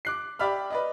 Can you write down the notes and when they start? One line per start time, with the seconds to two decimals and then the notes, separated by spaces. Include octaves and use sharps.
0.05 D6 F#6 C7
0.39 G4 D5 E5 B5 F6
0.70 B4 D5 D#5